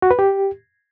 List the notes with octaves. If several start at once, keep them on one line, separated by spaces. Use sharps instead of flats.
F#4
B4
G4